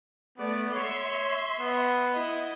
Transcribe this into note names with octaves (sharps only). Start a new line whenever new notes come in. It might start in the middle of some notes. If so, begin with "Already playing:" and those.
A3 B3 D5
C#5 E5 C6
B3
E4 D#5